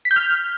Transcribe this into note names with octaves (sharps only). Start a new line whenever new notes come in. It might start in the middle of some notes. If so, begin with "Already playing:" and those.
B6
G6
F6